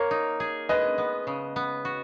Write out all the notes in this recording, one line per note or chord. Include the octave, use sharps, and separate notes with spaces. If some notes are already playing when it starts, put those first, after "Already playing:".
Already playing: A#3 A#4 C#5
D#4
G#4
G#3 B4 D#5
B3
C#3
B3
F#4